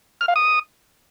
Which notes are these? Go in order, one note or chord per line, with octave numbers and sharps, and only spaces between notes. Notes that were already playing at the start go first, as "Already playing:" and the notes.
F6
F5
D#6